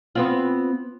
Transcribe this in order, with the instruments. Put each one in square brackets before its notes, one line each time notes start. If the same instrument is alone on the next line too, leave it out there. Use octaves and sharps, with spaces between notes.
[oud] B3 C4 F4